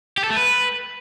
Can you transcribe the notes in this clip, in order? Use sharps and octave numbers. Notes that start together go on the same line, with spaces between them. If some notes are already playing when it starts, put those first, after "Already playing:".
G4
A4
A3
B4